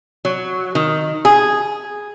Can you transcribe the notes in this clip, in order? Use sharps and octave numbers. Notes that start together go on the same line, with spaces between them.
F#3
D#3
G#4